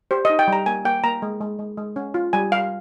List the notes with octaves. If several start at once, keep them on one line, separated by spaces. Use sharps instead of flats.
G4 C5
D#4 D#5
G5
G3 A#5
A#3 G#5
A#3 G5
A#3 A#5
G#3
G#3
G#3
G#3
C#4
F4
G3 G#5
G3 F5